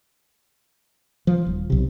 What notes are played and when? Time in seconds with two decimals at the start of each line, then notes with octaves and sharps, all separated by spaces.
1.27 F3
1.46 D#1
1.70 B1 C3